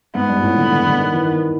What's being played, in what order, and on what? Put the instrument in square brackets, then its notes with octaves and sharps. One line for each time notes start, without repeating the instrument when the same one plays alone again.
[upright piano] G#2 [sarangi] B3
[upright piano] G2
A#2
A2
D3
D3
D3
D#3
E3
D#3